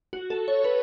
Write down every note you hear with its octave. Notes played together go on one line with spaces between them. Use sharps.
F#4
A4
C#5
B4